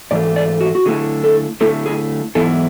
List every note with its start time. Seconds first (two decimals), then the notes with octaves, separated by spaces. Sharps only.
0.11 G#2 E3 A3 D5
0.36 D5
0.61 F#4
0.75 F#4
0.86 D3 A3 E4 G#4
1.24 A4
1.61 D3 A3 E4 A4
1.86 G#4
2.35 G#2 E3 B3 E4 A4